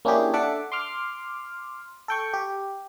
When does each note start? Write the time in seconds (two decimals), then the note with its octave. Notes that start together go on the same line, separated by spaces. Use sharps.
0.05 A#3 C#4 D4 E4 G4 G#4
0.33 D4 A4 E5 F#5 D6
0.72 C6 D6 F6
2.08 A4 G5 C#6
2.33 G4